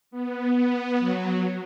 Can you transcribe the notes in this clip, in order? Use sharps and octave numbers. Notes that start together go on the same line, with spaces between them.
B3
B3
F#3